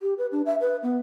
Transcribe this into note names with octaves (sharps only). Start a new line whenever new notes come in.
G4
B4
D4
E5
B4
B3